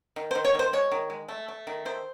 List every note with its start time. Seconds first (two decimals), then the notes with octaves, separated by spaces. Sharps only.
0.16 D#3
0.31 C5
0.35 D#3
0.45 C#5
0.55 D#3 C5
0.73 G#3 C#5
0.92 D#3
1.10 G#3
1.28 A3
1.48 A3
1.67 D#3
1.85 D#3 C5